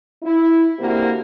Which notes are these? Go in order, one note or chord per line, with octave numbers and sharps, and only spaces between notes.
E4
D3 A#3 C4 E4 F#4 G4